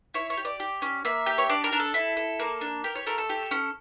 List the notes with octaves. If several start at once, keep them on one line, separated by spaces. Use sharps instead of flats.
E4 C#5
C#5
G4
D5
G4
C#4
A#3 E5
G4
C#5
D4 D5
A#4
D4
A4
E4
A4
A#3
D4
G4 A#4
C#5
A3 A#4
A4
G4
C#4